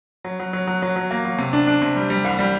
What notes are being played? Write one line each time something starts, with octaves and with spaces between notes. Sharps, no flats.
F#3
F#3
F#3
F#3
F#3
F#3
A#3
F#3
C3
D4
D4
C3
G3
G3
C2
G3